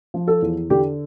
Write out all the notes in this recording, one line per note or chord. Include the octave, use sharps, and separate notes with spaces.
F3
A4
E2
D3 G4